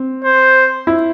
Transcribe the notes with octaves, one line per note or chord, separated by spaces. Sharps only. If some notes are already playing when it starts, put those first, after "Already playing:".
Already playing: C4
C5
E4